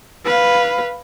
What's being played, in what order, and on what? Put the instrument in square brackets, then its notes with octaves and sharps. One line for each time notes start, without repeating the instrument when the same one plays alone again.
[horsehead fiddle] B4 F5